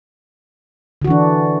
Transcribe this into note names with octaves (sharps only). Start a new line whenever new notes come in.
D3 E3 D4 F#4